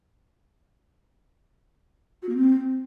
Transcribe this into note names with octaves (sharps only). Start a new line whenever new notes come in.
F#4
A#3
C4